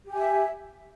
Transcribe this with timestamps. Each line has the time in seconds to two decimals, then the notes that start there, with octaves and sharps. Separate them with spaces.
0.07 G4
0.12 G#5
0.16 E5